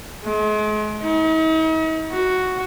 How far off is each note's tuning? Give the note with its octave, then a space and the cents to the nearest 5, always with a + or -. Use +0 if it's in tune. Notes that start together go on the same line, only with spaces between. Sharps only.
G#3 +40
D#4 +45
F#4 +0